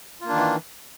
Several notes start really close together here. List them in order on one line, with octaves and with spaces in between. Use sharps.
F4 A#3 D4 D#3 E3